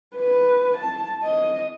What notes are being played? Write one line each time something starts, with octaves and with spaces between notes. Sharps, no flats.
B4
A5
D#5